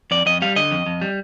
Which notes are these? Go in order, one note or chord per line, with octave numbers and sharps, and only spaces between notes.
F2 D5
F2 D#5
G3 F5
D3 D#5
F2
F2
G3